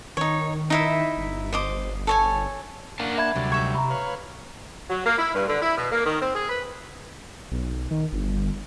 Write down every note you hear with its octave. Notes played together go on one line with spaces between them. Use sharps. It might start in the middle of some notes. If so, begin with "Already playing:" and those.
D#3 D#4 C#5
D#4 E4 E5
G1
C5 D#5 D6
A4 C#5 G#5
A#3 D4 A#4 F5 F#5 A5
E5 A5 B5 G#6
D2 C3 F#3 G3 D5
D#4 E5 C#6 G#6
A#5 B5
B4 C#5 F5
F#3
A#3
E4
G2
D3
E4
B2
A#3
D#3
C4
G#4
B4
B1
D#3
G1